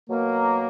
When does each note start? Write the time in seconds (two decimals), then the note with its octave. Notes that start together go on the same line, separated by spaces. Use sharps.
0.08 B2 F#3 A#3